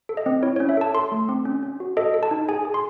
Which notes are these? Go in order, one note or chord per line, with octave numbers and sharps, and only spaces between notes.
A4
D#5
C4
E4 C#5
C#4 C#5
E5
A4 A5
A4 C6
A3
C4
C#4
C#4
F#4
A4 D#5
A4
A5
D#4
G#4 G#5
G#4
C6